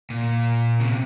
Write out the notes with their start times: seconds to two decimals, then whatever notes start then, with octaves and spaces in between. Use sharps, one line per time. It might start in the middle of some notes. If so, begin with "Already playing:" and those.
0.10 A#2
0.80 C#3
0.89 C3